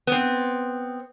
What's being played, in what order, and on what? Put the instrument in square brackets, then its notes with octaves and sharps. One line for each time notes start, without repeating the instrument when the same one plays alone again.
[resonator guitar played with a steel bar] B3 C4